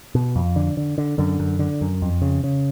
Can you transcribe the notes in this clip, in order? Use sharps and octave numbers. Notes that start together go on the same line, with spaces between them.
B2
F2
D3
D3
D3
F#2 D3
F#2
D3
F#2
F2
C#3
C#3